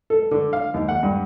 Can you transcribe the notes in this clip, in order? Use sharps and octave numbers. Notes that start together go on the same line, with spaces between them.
A4
D3
F5
D#2
F#5
G2